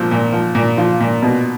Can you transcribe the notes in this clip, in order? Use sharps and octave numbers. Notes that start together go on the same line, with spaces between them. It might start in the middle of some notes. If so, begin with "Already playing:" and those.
Already playing: A#2 F3 C4
A#2
F3
A#2
F3 F4
A#2
B2